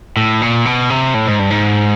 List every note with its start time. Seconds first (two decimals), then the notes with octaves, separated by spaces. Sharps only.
0.17 A2
0.41 A#2
0.65 B2
0.90 C3
1.14 A2
1.27 G#2
1.39 G2
1.50 G#2